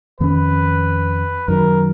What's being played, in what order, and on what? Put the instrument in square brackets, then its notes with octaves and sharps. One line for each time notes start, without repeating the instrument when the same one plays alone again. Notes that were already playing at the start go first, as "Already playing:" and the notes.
[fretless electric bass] F2 D#3 A#3 C#4 [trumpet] B4
[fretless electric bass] F#2 D#3 F#3 [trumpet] A#4